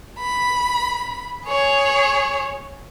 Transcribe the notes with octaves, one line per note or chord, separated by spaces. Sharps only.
B5
G#4 C#5